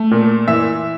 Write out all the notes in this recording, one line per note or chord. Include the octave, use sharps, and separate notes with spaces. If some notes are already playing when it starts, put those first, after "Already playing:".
Already playing: A3
A#2
E3 E5